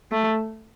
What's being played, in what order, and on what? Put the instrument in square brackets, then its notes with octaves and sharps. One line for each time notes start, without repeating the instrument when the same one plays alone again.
[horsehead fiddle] A3